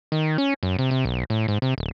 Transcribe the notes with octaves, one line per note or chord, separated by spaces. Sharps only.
D#3
C#4
F#2
C3
C3
B1
A2
G#2
C3
D1